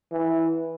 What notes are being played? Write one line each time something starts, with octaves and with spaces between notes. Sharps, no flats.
E3